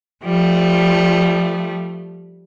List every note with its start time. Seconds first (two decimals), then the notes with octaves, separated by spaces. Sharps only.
0.23 F3 G3 A3